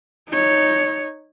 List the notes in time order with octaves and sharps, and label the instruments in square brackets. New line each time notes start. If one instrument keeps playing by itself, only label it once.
[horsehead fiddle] D#4 C#5